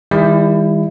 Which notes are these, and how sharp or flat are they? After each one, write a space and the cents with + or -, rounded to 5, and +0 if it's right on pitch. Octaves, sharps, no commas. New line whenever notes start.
D#3 +40 G3 +45 E4 +15